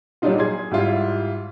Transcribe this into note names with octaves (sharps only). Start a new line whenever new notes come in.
A#2 F#3 G3 D4 D#4 F4
G#4 C6 G#6
G#2 G3 E4 F4